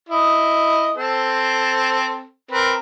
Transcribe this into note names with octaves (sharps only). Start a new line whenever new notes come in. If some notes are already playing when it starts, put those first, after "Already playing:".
E4 D#5
C4 A4 C5
C4 A#4 B4